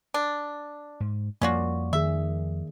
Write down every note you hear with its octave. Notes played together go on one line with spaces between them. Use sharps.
D4
G#2
F2 F3 G3 A#3 C#4 F4 F#4 D5
D#3 G#4 E5